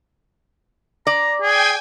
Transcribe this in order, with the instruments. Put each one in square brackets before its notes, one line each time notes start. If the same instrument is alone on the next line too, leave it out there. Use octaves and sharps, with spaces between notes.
[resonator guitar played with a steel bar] D5 [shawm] A#5
[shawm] G#4 [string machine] G5 G#5 G#6